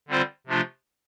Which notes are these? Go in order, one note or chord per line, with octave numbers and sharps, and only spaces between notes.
D3 G3 C4 F4 C5
C3 F3 A3 D4 F4